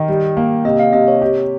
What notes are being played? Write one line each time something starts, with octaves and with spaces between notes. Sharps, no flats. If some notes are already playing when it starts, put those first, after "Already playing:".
Already playing: D#3 D#5
G3
A#3
C3 D#5
F5
C3 D#5
C#5
G4